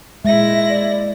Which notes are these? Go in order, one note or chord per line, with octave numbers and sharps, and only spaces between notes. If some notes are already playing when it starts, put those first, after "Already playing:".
A#2 G#3 E4 E5 A#6
D5